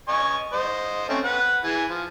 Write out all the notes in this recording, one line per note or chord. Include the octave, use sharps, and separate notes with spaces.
D#5 G#5 C#6
C5 D#5
A3 C4 C#4
B4 F#5
E3 G#4 G#5
F3